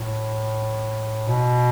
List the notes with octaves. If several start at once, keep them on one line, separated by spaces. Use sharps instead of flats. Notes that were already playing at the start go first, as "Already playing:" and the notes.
Already playing: A2
B2